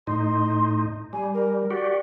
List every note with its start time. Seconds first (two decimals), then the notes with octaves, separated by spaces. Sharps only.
0.07 A2 D#4 C6
1.13 G3 G#5
1.34 A#4
1.71 F#4 G4 D5